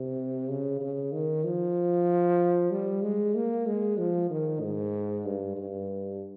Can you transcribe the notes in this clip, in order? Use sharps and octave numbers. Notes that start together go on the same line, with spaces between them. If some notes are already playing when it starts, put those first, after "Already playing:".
Already playing: C3
C#3
C#3
D#3
F3
G3
G#3
A#3
G#3
F3
D#3
G#2
G2
G2